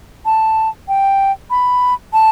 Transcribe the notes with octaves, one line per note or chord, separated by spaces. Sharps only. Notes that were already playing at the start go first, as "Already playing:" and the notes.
A5
G5
B5
A5